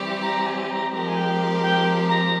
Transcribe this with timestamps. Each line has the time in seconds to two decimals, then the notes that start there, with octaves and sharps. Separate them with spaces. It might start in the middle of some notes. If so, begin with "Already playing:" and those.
Already playing: E3 G3 C4 G4
0.22 A#5
0.46 G#5
0.70 A#5
0.93 F3 G#3 C4 G4 A#4 A#5
1.07 G#5
1.16 G5
1.63 G5
2.09 A#5